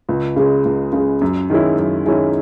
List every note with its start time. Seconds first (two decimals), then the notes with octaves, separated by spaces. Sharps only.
0.09 C#2
0.36 C#3 G#3
0.65 C#2
0.93 C#3 G#3
1.21 F#2
1.50 D#3 G#3 C#4 E4
1.79 F#2
2.06 D#3 G#3 C#4 E4